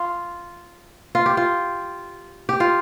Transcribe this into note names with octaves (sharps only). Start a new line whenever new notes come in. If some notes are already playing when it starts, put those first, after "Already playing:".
Already playing: F4
F4
G4
F4
G4
F4